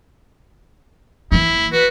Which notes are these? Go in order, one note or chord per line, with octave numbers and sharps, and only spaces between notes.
E3 A#3 E4
F#4 B4